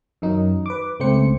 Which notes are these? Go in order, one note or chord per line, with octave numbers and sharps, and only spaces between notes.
F#2 D#3 F#3 D#4
B4 D6
C#2 A3 C4 C5 C#7